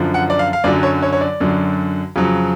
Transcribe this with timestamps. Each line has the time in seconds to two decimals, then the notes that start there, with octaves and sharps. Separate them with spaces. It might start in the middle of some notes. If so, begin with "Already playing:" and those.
Already playing: F#2 D3 F3
0.14 F#5
0.30 D5
0.39 F5
0.53 F5
0.64 F#2 D3 F#3 D5
0.83 C#5
1.03 C#5
1.13 C#5
1.21 D5
1.40 F#2 D3 F#3
2.16 F2 C#3 F#3